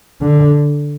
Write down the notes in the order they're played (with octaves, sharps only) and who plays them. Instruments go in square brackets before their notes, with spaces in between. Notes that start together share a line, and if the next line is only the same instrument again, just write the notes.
[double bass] D3